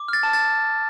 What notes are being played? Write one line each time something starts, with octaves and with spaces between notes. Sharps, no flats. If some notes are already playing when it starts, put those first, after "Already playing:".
Already playing: D6
F6 A6
A5
A6